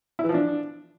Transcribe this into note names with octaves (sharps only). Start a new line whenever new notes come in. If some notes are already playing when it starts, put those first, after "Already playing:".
E4
E3
F3
D4